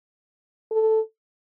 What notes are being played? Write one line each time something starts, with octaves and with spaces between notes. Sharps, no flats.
A4